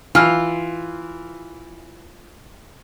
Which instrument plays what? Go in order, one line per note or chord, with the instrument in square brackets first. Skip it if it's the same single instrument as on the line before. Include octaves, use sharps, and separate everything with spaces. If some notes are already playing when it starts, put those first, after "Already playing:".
[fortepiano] E3 F6 [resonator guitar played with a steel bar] F4